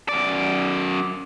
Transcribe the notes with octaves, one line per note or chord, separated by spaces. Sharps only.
F#2 D5